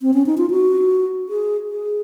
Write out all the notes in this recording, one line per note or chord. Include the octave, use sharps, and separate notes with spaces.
C4
C#4
D#4
F4
F#4
G#4
G#4